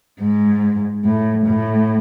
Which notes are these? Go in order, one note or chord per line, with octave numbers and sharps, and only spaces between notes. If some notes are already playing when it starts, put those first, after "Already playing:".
G#2
A2
A2